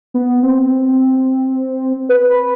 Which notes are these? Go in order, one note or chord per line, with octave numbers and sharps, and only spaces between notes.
B3
C4
B4